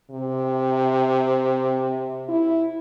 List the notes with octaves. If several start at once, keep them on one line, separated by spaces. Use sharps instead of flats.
C3
E4